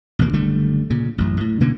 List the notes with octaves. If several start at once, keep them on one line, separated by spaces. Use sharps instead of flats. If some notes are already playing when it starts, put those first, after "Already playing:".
A1 D#2 B2 A#3
F#1 D3 G3 A3
A#2 C#3
A1 F#2
A2
B2 D3 A#3 C#4